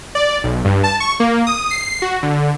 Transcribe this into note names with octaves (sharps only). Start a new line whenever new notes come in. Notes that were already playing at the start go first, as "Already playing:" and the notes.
D5
B1
G2
A5
C#6
A#3
D#6
C7
F#4
D3